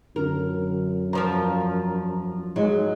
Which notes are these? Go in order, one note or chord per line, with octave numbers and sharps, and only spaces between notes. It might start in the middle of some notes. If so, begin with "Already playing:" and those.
F#2 D3 A#4
E2 F3 A#4 A#5
G#2 F#3 G#3 D#4